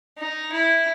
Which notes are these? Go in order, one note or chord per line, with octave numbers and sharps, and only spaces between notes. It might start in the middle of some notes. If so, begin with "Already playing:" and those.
D#4
E4